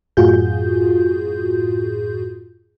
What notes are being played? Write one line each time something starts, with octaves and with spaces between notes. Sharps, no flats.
F#2 A2 F4 F#4 G#4 G6